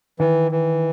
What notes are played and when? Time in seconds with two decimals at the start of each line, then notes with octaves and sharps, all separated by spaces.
0.19 D#3 E3
0.51 E3